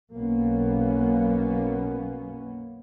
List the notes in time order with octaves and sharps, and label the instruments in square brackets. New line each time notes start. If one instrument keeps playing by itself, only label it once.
[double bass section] B1 F#2 A#3 B3 C#4